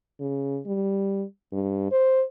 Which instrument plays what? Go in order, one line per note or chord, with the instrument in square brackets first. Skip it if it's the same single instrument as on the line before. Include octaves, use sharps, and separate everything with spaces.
[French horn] C#3
G3
G2
C5